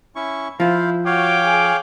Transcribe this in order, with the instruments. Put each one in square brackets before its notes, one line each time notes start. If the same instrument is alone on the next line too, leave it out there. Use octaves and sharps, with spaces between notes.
[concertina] C#4 E4 C#6
[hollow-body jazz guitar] F3 F4 [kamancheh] E4 [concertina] C5 F5
[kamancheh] F#4 [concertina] C#5 F5 [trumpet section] G5 D6
[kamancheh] G#4